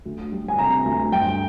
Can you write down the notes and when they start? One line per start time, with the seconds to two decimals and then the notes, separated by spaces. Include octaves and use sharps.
0.05 D2
0.32 G3
0.48 G#5
0.59 C3 A#5
0.85 D2
1.12 G2 G5